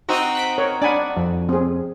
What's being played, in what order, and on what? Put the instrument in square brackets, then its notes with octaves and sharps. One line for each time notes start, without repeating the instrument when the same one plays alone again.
[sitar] C4 D#4 F#4
[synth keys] F#6 B6 D7
[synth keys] A#4 [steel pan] C#5
[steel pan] D4 G#5 B5 [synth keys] D5 F#5
[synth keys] F2
[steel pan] C4 G#4